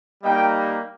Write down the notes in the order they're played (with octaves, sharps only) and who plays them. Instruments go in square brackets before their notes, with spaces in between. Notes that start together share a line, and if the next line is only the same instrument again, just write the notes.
[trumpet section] G3 A#3 D#4 D#5 G5